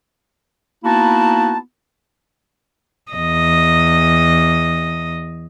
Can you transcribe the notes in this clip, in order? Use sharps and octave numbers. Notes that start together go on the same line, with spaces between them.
A#3 B3 D#4 E4 F#4 A5
E2 D#5